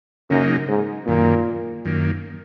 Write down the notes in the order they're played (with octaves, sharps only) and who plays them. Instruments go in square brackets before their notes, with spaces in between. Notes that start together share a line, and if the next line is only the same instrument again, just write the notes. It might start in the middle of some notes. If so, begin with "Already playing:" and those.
[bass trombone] F#2 [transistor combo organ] C#3 F#3 A#3 D#4
[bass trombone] G#2
[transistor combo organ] F#2 D#3 A#3 [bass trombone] A#2
[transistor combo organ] F#2 D#3 A#3